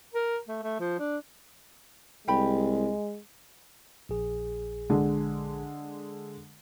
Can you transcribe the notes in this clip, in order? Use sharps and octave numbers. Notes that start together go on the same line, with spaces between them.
A#4
A3
A3
F3
D4
C2 G#3 G4 G5 B5
A#1 G#4
D3 G#3